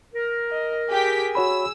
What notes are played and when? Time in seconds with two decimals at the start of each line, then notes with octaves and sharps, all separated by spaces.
0.14 A#4
0.52 D#5
0.90 G4 G#4 G5 B6
1.35 F#4 C#5 B5 E6